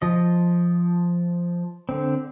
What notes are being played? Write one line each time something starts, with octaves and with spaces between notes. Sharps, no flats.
F3 D#5
D3 C4